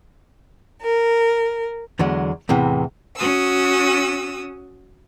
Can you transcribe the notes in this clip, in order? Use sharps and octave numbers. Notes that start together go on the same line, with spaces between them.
A#4
E2 D3 F#3 G#3
E2 A2 C3 E3
C#4 F#4 D#6 E6